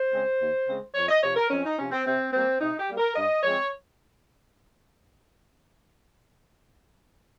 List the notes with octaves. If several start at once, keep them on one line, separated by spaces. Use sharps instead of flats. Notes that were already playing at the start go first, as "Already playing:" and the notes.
Already playing: C5
C#3 G#3 C4
D#2
C#3 G#3 C4
F2 C#5
D#5
C3 F3 C#5
A#4
F2 C#4
D#4
C3 F3 C#4
C4
C3 C4
G3 A#3 C4
C3 D#4
G4
G3 A#3
A#4
G2 D#5
F3 G#3 C4 C#5